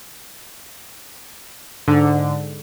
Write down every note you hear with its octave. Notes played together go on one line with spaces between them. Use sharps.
G#2 D3